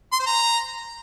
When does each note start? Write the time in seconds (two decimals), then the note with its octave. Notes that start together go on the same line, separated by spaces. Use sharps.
0.13 C6
0.19 C5
0.26 A#5